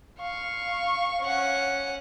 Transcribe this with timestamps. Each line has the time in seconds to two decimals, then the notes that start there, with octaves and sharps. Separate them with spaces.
0.20 F5 C#6
1.22 C#4 F#5